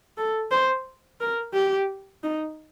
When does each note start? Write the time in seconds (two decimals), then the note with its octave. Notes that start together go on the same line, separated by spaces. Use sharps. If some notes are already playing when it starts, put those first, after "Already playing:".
0.18 A4
0.51 C5
1.21 A#4
1.54 G4
2.23 D#4